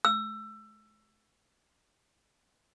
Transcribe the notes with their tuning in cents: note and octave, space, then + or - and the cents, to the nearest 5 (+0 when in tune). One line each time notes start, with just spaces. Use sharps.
E6 +20